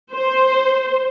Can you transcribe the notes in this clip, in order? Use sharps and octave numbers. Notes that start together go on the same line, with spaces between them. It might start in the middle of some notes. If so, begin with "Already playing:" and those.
C5